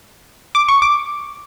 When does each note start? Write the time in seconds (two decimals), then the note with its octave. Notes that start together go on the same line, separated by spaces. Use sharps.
0.55 D6
0.69 C#6
0.82 D6